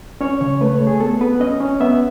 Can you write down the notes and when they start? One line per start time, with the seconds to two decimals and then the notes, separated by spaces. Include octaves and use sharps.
0.21 C#4 C#5
0.41 C#3 C#5
0.61 A3 B4
0.74 C#5
0.81 A3
0.87 G#4
1.00 B3 A4
1.21 B3 B4
1.40 C#4 D#5
1.60 C#4
1.80 B3 E5